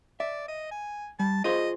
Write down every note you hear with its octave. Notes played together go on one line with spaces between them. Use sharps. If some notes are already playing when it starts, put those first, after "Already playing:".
D5 E5
D#5
G#5
G3 A5
F4 G#4 C5 D#5